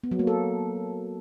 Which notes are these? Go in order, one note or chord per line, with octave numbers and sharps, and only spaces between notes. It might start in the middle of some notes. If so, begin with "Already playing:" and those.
B3
F#3
A#3
A4